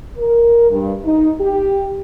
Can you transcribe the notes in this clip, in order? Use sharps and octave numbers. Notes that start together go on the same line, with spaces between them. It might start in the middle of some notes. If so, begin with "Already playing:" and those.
A#4
G2
D#4
G4